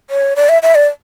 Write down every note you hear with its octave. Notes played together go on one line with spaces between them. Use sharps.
C#5
D5
E5
E5
D5